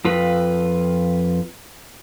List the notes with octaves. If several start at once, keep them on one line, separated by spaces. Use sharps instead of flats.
F2 F4 B4